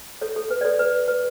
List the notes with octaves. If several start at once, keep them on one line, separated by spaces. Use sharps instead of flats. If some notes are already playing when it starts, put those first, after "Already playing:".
A4 C#5
A4
B4
D5
A4 C#5
B4
B4